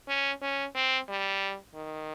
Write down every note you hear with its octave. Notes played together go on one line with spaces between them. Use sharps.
C#4
C#4
C4
G3
D#3